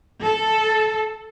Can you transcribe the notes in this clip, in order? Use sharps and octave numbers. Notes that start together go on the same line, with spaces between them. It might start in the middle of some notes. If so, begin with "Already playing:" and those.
A4